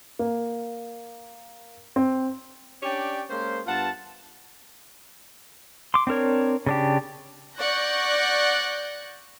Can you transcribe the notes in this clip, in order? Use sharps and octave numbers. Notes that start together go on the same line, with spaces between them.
A#3
C4
C#4 D4 G4 C#5 D5 G5
G#3 A#3 C#4 C5
G2 B3 F4 F#5 A5
C6 D6
C4 D4 A#4 C#5
C#3 D4 G4
D5 F#5 C#6 F#6 G6 A#6